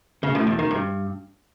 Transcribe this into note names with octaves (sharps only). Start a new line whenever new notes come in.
C#3
A2
E2
D#3
G2